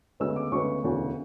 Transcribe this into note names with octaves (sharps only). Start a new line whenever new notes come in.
D2 C#3 G#3 B3 E6
D6
D2 C#3 G#3 B3 C#6
E1 D2 C#3 E3